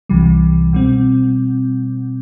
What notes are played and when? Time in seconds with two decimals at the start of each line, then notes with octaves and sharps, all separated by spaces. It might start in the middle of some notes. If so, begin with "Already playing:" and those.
0.09 C2 C3 E3 G3
0.73 B2 G3 C4